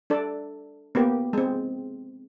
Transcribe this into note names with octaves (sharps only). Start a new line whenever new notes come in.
D4 A4 D5
A#3 B3 G4
G#3 C4